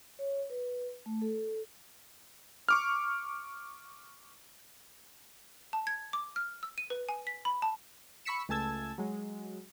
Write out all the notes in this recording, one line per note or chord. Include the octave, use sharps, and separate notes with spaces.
C#5
B4
A3
A4
C#6 D6 F6
A5
G#6
D6
F6
E6
D#7
B4
G#5
B6
B5
A5
B5 C#6 E6 B6 C#7 E7
C#2 A3 G#5 A5 E6 G#6
F#3 G#3